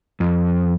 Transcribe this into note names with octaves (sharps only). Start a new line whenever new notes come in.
F2